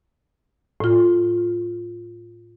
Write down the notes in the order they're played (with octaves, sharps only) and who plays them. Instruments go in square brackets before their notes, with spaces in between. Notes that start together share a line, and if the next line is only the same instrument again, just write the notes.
[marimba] A2 F4